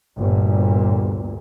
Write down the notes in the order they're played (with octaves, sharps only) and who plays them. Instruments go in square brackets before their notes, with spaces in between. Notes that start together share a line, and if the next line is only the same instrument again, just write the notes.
[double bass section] G1 D2 A#2